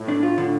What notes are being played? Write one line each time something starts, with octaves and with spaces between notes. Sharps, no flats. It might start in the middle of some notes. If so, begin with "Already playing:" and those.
Already playing: A2
D4
F4
D3